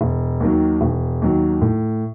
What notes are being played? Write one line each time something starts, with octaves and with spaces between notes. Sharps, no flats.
E1
D#2 D#3 F#3
E1
D#2 D#3 F#3
A2